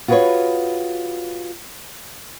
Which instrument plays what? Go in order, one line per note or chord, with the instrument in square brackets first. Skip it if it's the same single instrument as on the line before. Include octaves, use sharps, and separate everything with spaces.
[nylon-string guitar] F4 F#4 G#4 A#4 B4 C#5